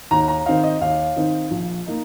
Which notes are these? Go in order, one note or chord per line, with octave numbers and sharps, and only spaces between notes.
D#2 A#5
A#5
D#3 C4 D#4 F5
D#5
D#2 F5
D#3 C4 D#4
A#1
A#3 D#4